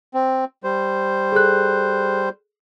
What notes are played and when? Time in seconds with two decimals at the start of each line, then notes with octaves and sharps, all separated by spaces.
0.14 C4
0.64 G3 C5
1.32 G#4 A4 F#6